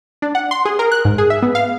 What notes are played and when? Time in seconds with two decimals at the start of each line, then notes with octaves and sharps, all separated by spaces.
0.22 D4
0.35 F#5
0.51 C6
0.65 G#4
0.79 A#4
0.92 F#6
1.05 G#2
1.18 G#4
1.30 E5
1.42 B3
1.55 F5